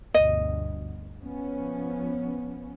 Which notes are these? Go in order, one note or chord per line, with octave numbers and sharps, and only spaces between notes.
G1 D2 B2 D#5
F3 B3 C#4